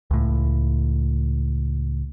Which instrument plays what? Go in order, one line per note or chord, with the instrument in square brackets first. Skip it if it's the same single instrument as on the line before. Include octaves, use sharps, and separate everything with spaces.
[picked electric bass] C#2 A2